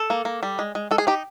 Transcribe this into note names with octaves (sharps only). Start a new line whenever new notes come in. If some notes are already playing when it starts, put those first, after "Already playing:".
Already playing: A4
A#3
A#3
G3
G#3
G#3
G#3 A4
G#4
D#4 G4